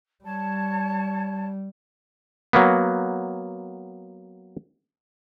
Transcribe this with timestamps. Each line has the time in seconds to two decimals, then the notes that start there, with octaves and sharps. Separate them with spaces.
0.24 G3 C#5 A5
2.53 F#3 A#3 B3